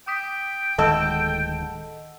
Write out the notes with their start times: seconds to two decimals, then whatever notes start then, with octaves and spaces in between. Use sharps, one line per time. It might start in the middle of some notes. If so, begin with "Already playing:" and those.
0.07 G5 D6 D#6 B6
0.78 D1 D#3 G#3 A4 D#5 F#5 A5 E6